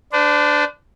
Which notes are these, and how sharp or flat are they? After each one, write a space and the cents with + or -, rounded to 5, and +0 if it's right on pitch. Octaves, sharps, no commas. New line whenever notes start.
D4 +0 C5 -45